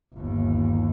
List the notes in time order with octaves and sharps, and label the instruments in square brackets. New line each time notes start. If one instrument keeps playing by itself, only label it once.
[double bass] G1 D#2